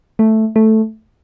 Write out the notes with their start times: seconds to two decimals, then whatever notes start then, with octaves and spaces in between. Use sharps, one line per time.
0.19 A3
0.56 A3